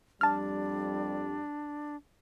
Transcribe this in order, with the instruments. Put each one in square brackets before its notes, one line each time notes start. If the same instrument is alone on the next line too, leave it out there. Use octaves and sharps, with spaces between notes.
[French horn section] F2 G3 [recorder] D4 [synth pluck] A5 F6